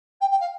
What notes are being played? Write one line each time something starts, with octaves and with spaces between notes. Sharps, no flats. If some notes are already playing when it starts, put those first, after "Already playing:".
G5
G5
F5